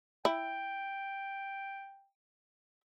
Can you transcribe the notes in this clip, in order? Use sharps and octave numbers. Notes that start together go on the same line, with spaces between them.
E4 G5